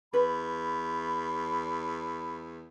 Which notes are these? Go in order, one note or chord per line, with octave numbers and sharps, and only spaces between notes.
E2 B4 B5